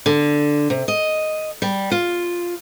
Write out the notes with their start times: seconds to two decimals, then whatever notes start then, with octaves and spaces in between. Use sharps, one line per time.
0.06 D3
0.70 C3
0.88 D#5
1.62 G3
1.91 F4